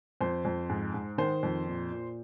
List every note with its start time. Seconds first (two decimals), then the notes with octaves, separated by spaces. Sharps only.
0.21 F2 C5
0.45 F2
0.69 G#2
0.94 G#2
1.18 D#3 C5
1.43 F2
1.67 A#2
1.91 A#2